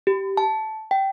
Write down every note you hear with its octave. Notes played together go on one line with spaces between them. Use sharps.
G4
A5
G5